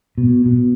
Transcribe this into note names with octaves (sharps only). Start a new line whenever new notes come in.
B2
B2